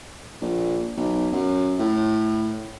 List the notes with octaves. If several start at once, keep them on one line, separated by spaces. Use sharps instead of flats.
A#1
B1
F#2
A2